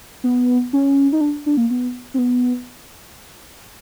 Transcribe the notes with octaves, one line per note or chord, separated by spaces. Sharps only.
B3
C#4
D#4
D4
D4
A#3
B3
C4
B3